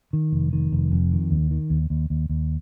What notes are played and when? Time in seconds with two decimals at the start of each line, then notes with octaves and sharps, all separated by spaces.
0.13 D#3
0.32 F1
0.53 D#3
0.72 F1
0.92 F2
1.12 D#3
1.31 D#2
1.51 D#3
1.70 D#2
1.90 D#2
2.10 D#2
2.29 D#2